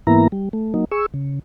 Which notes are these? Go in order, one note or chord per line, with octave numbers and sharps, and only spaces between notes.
G#2 E3 A#3 B3 E4 A#5
G3
A3
F#3 A#3 D#4
G#4 C#6 E6
C#3